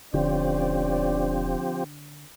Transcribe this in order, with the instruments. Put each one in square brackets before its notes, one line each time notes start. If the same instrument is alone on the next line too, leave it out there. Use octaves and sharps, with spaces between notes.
[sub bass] E1 [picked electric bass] D3 [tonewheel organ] F3 C4 G4 [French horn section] C#4 C5 D5